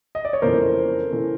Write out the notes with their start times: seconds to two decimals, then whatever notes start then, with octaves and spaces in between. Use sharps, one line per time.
0.15 D#5
0.25 D5
0.33 C#5
0.42 F2 C#3 E3 A3 A#4 C5
1.11 C#3 E3 A3